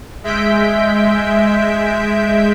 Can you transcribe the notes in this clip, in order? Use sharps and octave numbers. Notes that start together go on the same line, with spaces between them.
G#3 E5 G6 B6 D7